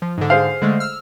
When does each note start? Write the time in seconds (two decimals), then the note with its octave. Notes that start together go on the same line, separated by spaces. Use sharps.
0.02 F3
0.18 G#2 D3
0.30 G#4 C5 F5
0.62 D3 G#3 A3
0.80 E6 F6